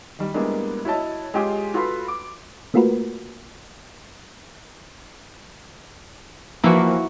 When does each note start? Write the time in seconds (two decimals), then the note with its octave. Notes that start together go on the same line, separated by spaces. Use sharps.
0.19 D#3 G3
0.34 G3 G#3 A#3 B3 D4 E4
0.85 E4 F#4 C#5 D#5 A5
1.34 G#3 C#4 F4 G4 G#4
1.74 F4 F#4 A4 B4 B5 C6
2.08 D6
2.74 A3 A#3 F4 F#4 A#4 B4
6.64 E3 F3 A#3 E4 F#4